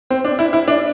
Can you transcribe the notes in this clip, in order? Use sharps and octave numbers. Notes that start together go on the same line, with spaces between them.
C4
D4
E4
E4
D4